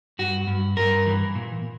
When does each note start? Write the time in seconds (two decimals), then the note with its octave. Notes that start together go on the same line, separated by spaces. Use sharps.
0.19 G2 F#4
0.47 G2
0.77 G2 A#4
1.06 E3
1.35 A#2